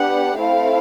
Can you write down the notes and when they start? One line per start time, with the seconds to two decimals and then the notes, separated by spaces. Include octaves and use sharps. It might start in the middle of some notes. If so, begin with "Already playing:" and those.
Already playing: B3 D4 G4 F#5
0.37 A3 C4 E4 F5